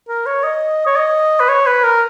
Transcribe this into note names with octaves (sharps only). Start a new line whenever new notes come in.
A#4
C#5
D#5
C#5
D#5
B4
C#5
B4
A#4